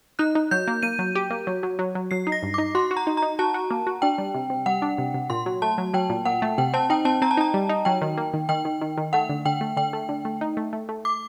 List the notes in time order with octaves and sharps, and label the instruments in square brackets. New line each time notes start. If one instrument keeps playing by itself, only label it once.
[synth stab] D#4 [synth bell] F#6
[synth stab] D#4
[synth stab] F#3 [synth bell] G6
[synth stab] A#3
[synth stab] A#3 [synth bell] D#7
[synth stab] F#3
G4
A#3
F#3
F#3
F#3
F#3
[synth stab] F#3 [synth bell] C7
[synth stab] D#4
[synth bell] A#6
[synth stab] G2
[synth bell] D6
[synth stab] D#4
[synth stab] F#4 [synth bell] C6
[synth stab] F#4
[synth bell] A#5
[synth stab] D#4
[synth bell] A#5
[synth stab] D#4
[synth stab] F#4 [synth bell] A5
[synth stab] F#4
A#3
F#4
[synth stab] D4 [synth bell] G5
[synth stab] G3
C3
C3
[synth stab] G3 [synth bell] F#5
[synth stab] D4
C3
C3
[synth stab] A#2 [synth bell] C6
[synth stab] F#3
[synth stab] A3 [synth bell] A5
[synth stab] F#3
[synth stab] F#3 [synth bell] G5
[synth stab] A#2
[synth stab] A#2 [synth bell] F#5
[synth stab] A3
[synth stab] C3 [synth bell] G5
[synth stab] C4 [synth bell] A5
[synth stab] D#4 [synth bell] G5
[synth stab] C4 [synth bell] A5
[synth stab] C4 [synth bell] A#5
[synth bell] A5
[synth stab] D#4 [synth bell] A#5
[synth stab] G3
D#4
[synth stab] F#3 [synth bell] G5
[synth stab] D#3
A#3
D#3
[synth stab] D#3 [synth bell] G5
[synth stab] D#3
D#3
D#3
[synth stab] A3 [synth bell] F#5
[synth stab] D3
[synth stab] D3 [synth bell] G5
[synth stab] A3
[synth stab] D3 [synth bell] G5
[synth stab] A3
D3
A3
D#4
A3
A3
A3
[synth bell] D6